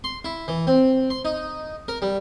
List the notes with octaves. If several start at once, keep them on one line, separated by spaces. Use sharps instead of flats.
C6
E4
E3
C4
C6
D#4
A#4
G3